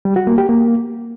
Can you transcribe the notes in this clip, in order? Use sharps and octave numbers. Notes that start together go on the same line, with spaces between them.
G3
F#4
A#3
G4
A#3